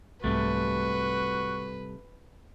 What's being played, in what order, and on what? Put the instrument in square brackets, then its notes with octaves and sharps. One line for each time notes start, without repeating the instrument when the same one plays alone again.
[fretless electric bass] C2 G#2 [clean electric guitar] C3 G3 A3 [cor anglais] F#4 [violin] B4